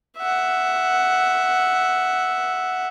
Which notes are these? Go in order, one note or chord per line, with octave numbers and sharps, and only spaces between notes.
E5 F#5